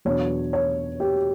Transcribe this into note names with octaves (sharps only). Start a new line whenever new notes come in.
E2 B2 F#3 B3 D4 C#5
C#5
G4